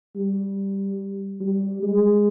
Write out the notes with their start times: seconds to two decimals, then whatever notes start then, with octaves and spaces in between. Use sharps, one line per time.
0.16 G3
1.40 G3
1.83 G#3